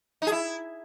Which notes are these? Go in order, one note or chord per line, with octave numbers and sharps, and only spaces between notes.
D#4
G#4
E4